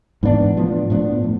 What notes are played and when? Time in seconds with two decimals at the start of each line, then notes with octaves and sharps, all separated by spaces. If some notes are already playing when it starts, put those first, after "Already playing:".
0.23 G#2 E3 B3 D4
0.57 A2 F3 B3 D4
0.90 A2 F3 B3 D4
1.24 A2